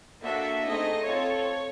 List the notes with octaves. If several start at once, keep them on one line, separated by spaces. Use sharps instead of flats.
A#3 D4 F#4 A4 E5
A3 C4 D#4 G#4 D#5
C4 F4 A4 C#5